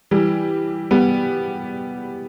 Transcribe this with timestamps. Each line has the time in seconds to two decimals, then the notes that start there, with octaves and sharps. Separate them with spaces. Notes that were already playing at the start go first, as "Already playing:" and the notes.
0.11 E3 G3
0.91 G3 B3